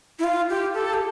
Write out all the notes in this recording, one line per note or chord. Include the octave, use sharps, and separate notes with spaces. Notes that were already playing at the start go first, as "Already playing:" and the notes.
E4
F4
G4
A4
G4